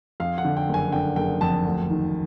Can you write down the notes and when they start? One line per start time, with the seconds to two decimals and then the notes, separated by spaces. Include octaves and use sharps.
0.20 F2 F5
0.38 F#5
0.45 D3
0.57 G5
0.69 F#1 G#5
0.92 D3 G5
1.16 F#1 G5
1.41 F2 A5
1.65 D2
1.90 D#3